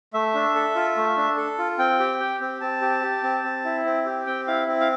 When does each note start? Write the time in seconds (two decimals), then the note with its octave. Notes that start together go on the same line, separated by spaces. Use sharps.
0.14 A3 E5
0.34 D4
0.55 A4
0.76 F4
0.96 A3
1.17 D4
1.37 A4
1.58 F4
1.79 C4 G5
1.99 G4
2.20 G4
2.41 C4
2.61 C4 A5
2.81 G4
3.03 G4
3.23 C4
3.44 C4
3.64 E4
3.85 C4
4.06 G4
4.26 C4 G5
4.47 E4 F5
4.68 C4
4.80 F5